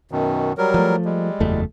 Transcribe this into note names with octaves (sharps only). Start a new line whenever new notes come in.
F#2 B2 D#3
F#3 G3 A#4
F3 A3
G3 G#3
F#1 E2 A3